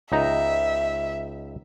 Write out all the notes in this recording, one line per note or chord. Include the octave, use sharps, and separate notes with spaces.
C#2 D#4 E5 A#5